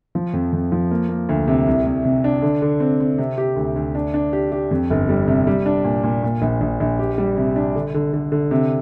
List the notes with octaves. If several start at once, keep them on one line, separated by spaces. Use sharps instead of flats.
F3
F2
F2
F3
A#3
A#3
D2
C3
C2
C2
C3
D4
D3
D3
C4
C4
C3
G4
D2
D2
D4
D4
G4
G4
F2
G1
G3
C3
G3
D4
A#2
A#2
A#2
A#1
A#1
A#1
G4
G3
C3
D4
D3
D3
D3
D3
C3